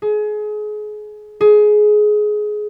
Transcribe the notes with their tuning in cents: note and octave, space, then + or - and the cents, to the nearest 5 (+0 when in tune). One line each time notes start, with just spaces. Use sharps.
G#4 +30
G#4 +20